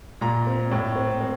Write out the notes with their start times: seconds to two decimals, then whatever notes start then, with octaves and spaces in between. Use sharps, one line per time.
0.21 A#2 A#5
0.47 C4
0.71 A2
0.96 C4
1.21 C4